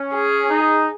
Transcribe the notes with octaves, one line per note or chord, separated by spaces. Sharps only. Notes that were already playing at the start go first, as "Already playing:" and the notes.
Already playing: C#4
G#4
D#4